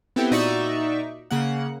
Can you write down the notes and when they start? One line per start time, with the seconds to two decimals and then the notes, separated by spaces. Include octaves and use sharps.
0.16 B3 C4 E4 G4 A4
0.31 A#2 D#4 F#4 D5 E5 C#6
1.31 C#3 A#3 F#5